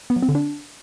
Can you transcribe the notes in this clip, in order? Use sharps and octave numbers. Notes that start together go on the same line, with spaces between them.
B3
F#3
C4
D3
D4